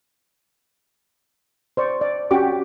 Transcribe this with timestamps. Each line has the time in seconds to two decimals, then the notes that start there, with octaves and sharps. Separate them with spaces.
1.77 C5 D5 C#6
2.01 D5
2.31 C#4 F#4 G4 D6